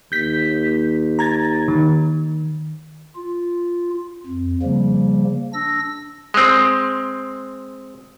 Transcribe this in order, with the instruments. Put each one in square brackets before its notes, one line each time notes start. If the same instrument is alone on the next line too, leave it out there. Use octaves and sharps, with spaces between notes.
[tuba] D#2 [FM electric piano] G6 B6
[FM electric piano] A#5 G#6 A6
D#3
[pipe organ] F4
F2
C#3 F3 G3 A#3
D4 E6 A#6
[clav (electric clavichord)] G#3 C4